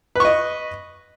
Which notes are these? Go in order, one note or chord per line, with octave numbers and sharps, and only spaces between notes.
B4 D#5 C#6